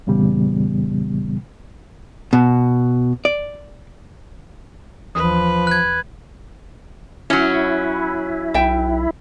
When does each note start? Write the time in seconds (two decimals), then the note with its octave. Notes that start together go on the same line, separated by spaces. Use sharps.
0.07 F2 A#2 C#3 E3 G3 B3
2.33 B2
3.25 D5
5.15 D#2 E3 F3 B4 D#6
5.67 F#6 G#6
7.30 F#3 C#4 E4
8.54 B1 E5 G5